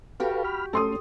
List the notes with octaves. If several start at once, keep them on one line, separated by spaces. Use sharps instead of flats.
F#4 G4 A4 B4 F5 G5
B5 F6
A3 C#4 A4 C6 D#6